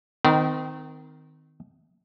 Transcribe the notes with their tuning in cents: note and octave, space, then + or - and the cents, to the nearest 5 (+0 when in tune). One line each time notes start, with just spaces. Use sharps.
D#3 +0 C4 -35 A#5 +40